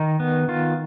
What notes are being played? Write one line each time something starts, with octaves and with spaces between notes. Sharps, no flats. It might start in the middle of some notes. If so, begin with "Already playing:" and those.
Already playing: D#3 D#4
B3
D#3 F4